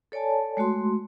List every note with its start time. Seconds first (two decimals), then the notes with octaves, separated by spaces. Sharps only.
0.12 A4 C#5 D5 G#5 A5
0.57 G#3 A3 F#4 C6